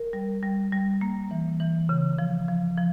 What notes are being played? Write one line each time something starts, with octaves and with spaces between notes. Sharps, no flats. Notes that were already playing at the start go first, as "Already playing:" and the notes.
Already playing: A#4
G3
G3
G3
A#3
E3
E3
C#3
F3
F3
F3